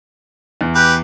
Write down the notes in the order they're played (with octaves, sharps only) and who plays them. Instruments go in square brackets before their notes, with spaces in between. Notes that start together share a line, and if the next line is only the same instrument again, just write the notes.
[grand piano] E2
[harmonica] G4 B4